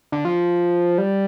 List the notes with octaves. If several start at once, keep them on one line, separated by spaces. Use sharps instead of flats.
D3
F3
G3